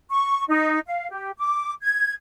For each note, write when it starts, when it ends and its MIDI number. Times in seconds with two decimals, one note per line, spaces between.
0.10 0.44 85
0.48 0.78 63
0.87 1.08 77
1.10 1.30 67
1.37 1.71 86
1.82 2.13 92